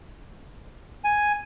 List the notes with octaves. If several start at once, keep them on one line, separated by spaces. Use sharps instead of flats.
G#5